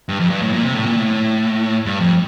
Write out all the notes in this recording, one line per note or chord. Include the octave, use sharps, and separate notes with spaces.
G2
F2
G2
A2
A#2
C3
A2
A#2
A2
G2
F2